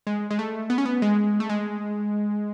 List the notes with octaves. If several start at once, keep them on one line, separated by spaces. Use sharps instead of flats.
G#3
G#3
A3
B3
C#4
B3
G#3
A3
G#3